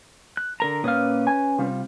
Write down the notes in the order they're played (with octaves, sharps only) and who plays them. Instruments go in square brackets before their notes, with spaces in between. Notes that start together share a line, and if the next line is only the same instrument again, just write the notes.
[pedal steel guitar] F#6
D3 A#4 A#5
[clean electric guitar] A#2 A#3 F5 [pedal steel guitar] C#4 B4 D#6
[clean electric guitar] G#5
C3 G3 F4